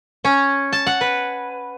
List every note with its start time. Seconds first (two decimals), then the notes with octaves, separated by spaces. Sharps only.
0.25 C#4
0.73 A5
0.87 F#5
1.01 B4